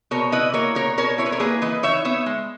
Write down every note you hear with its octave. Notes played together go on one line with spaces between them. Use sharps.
B2 A#4 C#5
E4 B4 D#5
A#3 A#4 C#5
B2 A#4 C#5
B2 A#4 C#5
E4 C#5
B4
A#4 C#5
A#3 G#4 B4
E3 B4 D#5
D#4 C#5 E5
B3 C#5 E5
G#3